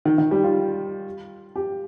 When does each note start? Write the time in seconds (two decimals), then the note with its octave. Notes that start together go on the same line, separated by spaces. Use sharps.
0.05 D#3
0.18 D#3
0.31 G3
0.43 F4
1.56 G4